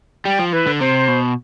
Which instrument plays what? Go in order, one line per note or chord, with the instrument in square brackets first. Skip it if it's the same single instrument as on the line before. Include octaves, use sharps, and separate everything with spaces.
[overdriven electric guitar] G3 [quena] G5
[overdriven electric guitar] F3
[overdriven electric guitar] E3 [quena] B4
[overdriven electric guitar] D3
[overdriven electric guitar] C3 [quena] C5
[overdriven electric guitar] B2